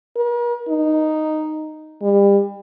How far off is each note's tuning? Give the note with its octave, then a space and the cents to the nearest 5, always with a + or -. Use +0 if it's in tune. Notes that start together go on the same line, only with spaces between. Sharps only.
A#4 +45
D#4 -5
G3 +35